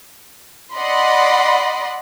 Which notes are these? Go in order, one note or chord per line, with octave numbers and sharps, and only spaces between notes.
D5 D#5 F#5 B5 C6